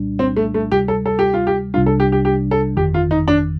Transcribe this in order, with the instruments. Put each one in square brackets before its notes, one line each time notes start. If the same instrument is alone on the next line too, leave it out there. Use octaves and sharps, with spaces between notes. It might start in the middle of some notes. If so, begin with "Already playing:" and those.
Already playing: [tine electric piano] C2 A#2 G3 D4
[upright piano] C4
A3
A3
[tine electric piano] D2 C3 G3 [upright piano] G4
[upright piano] A4
A4
G4
F4
G4
[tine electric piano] C2 C3 G3 D4 [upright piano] F4
[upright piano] A4
G4
G4
G4
A4
[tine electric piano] G1 F2 D#3 [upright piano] G4
[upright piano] F4
D#4
D4